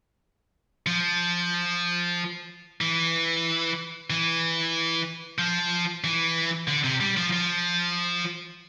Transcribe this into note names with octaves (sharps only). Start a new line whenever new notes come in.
F3
E3
E3
F3
E3
D3
C3
G3
F3
F3